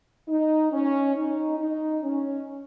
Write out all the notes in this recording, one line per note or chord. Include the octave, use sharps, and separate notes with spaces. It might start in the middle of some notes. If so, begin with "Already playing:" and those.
D#4
C#4
D#4
D#4
C#4